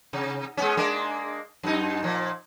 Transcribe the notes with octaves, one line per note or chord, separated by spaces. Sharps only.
C3
G#3 B3 C#4
G#3 A#3 D4
F#2 D#4
A#2 F3